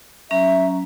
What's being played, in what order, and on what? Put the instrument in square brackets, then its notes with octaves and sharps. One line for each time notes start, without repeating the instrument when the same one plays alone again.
[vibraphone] F#3 C#4 A#5 [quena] E5